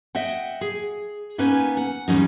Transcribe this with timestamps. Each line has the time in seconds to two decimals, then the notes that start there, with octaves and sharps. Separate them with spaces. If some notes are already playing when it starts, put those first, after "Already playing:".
0.15 D#5 E5 F#5 G5
0.61 G#4
1.38 A#3 B3 C#4 D#4 B4 G#5
1.77 F#5
2.08 E2 G3 A3 C#4 D#4